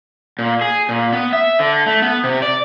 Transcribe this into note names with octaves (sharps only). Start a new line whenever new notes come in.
A#2
G#4
A#2
B3
E5
D3
A3
B3
C3
D5